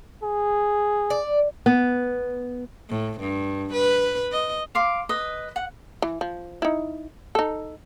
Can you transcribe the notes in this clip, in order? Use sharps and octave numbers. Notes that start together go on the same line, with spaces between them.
G#4
D5
B3
A2
G2
B4
D#5
F5 C6 D6
B4 D#5
F#5
E3
F3
D#4 E4
D#4 A4